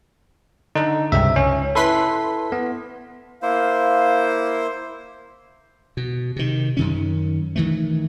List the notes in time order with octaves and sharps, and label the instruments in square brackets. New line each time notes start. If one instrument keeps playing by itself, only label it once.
[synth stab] D3 [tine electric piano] D#4
[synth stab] C#2 G2 C3 [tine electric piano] E5
[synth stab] C#2 [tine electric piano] C#4
[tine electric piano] E4 A4 [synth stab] B4 C6 B6
[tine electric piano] B3
[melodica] A#3 E4 C5 [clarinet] F5
[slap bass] B2
C3 D#3
F#2 D#3 C#4
D#3 E3 A3